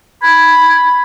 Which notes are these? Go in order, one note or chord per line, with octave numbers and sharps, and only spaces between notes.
B5 G#6